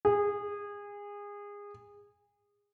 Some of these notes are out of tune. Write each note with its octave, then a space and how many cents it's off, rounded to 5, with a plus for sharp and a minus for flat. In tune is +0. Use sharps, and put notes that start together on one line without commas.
G#4 -25